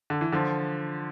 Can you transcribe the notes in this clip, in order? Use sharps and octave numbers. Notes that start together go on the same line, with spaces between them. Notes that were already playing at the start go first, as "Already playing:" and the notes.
D3
E3
D3 F3